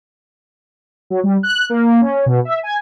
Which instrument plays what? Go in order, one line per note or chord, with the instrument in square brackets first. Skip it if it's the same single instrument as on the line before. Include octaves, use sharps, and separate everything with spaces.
[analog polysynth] F#3
G3
F#6
A#3
C#4
B2
E5
G#5